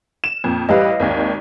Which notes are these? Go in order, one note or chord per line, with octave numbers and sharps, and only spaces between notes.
E7
F2 A#2
A1 G3 B4 D#5 F5
G#1 D#2